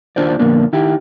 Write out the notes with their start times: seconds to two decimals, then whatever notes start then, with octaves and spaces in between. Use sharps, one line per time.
0.16 D#2 D4 F4 C5 D5
0.39 F2 A#2 D3 A#3 B3 D4
0.73 D#3 E4 G4